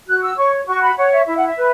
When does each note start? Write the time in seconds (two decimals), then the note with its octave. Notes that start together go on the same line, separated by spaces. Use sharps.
0.07 F#4 F#6
0.22 E6
0.37 C#5 C#6
0.67 F#4 C#6
0.81 B5
0.96 C#5 F#5
1.12 E5
1.27 E4 E5
1.37 F#5
1.45 E5
1.56 B4